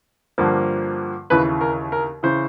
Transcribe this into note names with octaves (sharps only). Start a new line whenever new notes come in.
G2 D3 F3 A#3
D#2 C#3 E3 B4
A#4
A#4
C#3 E3 C5